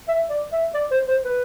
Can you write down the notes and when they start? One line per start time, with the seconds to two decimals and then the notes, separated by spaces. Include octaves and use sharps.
0.08 E5
0.30 D5
0.52 E5
0.74 D5
0.91 C5
1.08 C5
1.25 B4